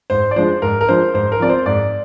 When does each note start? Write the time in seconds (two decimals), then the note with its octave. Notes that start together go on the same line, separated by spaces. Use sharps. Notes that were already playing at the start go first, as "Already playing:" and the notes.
0.10 G#2 C5
0.31 D5
0.36 F3 G#3 D4 C5
0.62 G#2 A#4
0.81 A#4
0.88 F3 G#3 D4 C5
1.14 G#2 C5
1.32 A#4
1.40 F3 C4 D5
1.49 C5
1.66 G#2 D5